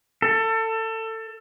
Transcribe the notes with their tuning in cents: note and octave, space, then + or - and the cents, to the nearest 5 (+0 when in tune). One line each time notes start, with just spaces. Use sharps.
A4 +25